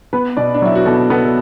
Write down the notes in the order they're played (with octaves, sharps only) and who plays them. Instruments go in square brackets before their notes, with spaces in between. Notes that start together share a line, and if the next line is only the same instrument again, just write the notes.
[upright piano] B3 [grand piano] B4
[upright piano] B2 [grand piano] D5
[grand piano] D4
[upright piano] F#3 [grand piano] E4
[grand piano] F#4
[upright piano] B2 [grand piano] A4
[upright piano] B3 [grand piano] A4
[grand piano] A4